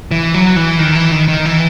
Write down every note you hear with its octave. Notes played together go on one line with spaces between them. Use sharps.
E3
F#3
E3
D#3
E3
D#3
D#3
E3